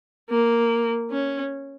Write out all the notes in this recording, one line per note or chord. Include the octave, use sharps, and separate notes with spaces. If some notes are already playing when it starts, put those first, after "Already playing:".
A#3
C#4